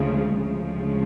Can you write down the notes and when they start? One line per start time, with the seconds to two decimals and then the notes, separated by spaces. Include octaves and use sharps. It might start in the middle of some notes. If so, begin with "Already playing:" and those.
Already playing: D2 C#3 F3 G#3
0.44 D2 C#3 F3 G#3